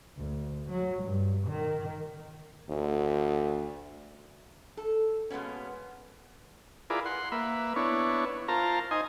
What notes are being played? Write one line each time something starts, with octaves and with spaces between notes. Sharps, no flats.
D2
F#3
G2
D#3
D2
A4
B2 G#3 A#3 B3 C#4
E4 F4 G#4 A#4 B4 D5
F#5 C6
A#3 B4 E5
B3 D4 E4 C#5
F4 A#4 C5 A5 A#5
D#4 C5 D#5 G#5